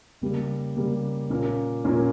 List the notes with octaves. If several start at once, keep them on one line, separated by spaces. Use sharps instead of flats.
C#3 G3 A#3
C#3 G3 A#3
A#2 A#3 C#4
A#2 A#3 C#4